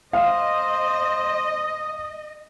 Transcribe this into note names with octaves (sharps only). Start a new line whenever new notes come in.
C5 D#5 F5 D#6